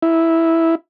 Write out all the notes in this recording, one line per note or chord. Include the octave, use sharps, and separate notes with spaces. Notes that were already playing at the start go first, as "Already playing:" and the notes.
E4